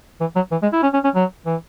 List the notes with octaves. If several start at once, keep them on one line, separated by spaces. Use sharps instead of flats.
E3
F#3
E3
G#3
E4
C#4
C#4
C#4
F#3
E3